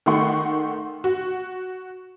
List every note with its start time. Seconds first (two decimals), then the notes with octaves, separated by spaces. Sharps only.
0.06 D#3 A3 F#5 C6 C#6
1.04 F#4